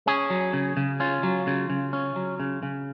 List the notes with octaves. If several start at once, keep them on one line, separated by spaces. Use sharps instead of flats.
C#4 G#4
F#3
C#3
C#3
C#4 F4
F#3
C#3
C#3
C#4
F#3
C#3
C#3